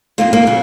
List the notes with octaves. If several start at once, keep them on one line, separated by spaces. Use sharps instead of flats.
F2 D#3 A#3 F4
A#3
C#3 F#3